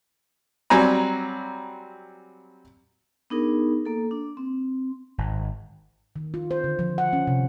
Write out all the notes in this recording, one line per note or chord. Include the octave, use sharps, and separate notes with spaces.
F#3 G3 C4 G#5 A#5
B3 D4 D#4 G#4 A#4
A#3 A4
D4
C4
G#1
D#3
F4
C5
D3
F3
F#5
C#4
C3